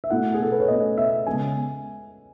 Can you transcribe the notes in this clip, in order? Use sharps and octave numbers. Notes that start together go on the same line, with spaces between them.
E5
B2 A3 E4 F#5
G#4
A4
B4
C#5
B2 A3 C#4 D#5
E5
C#3 G#3 B3 G#5